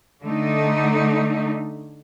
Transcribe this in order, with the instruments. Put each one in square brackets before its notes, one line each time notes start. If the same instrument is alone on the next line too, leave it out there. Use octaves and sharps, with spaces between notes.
[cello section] D3 A3 D#4